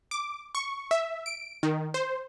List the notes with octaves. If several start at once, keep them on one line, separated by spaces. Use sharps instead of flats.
D6
C#6
E5
D7
D#3
C5